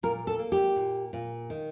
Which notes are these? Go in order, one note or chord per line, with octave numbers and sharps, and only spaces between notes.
A#2 A#4
A4
A#3
G4
A#2
A#2
D#3